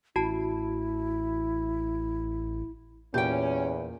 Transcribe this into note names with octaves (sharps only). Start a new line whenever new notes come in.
A1 E4 F#4 A5
E2 A#2 C#4 G4 G5